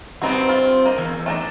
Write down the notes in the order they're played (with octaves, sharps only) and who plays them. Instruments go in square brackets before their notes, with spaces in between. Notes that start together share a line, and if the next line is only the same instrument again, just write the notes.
[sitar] G2 C4 [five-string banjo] B3 D#4 F#4
[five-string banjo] F4
A#3 D#5
[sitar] E2
[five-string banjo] A3 D4 D#4